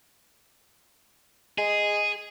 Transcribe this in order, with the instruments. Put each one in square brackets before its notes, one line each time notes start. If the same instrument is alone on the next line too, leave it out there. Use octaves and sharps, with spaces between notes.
[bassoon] G#3 [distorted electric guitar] G#4